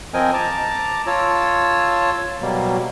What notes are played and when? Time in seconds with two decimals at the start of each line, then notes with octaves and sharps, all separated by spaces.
0.14 F3 C4 A#4 D#5 G5 G#5
0.34 A5 A#5 D6
1.07 F4 C#5 A5 E6
2.41 B2 F#3 G3 A#3